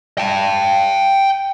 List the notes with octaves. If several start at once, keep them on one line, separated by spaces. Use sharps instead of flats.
G5 A5